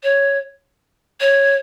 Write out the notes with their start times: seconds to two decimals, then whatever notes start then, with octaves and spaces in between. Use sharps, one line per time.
0.03 C#5
1.20 C#5